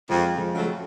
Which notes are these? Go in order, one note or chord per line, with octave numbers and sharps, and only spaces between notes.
F2 F3 G#3
F3 G#3
C#3 F#3 A3